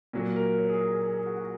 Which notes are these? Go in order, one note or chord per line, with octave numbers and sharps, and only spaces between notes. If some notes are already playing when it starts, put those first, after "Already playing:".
A#2 F#3 A#3
A#4
C#5
G#4
A#4
G#4
G#4
G#4
F#4
F#4